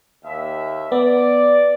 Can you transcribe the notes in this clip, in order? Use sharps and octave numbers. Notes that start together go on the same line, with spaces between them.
D#2 E5
B3 D5